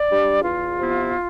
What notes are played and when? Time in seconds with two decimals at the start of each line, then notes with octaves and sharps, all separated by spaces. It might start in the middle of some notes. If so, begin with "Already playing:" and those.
Already playing: D5
0.09 G3 D4
0.44 E2 F4
0.79 C3 F3 B3 E4